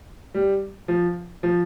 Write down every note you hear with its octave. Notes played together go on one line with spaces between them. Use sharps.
G3
F3
F3